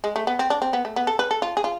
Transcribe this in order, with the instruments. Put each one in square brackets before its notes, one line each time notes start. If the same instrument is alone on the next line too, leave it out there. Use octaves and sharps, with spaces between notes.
[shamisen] G#3
A3
B3
C4
D4
C4
B3
A3
B3
A4
B4
A4
F4
G#4
F4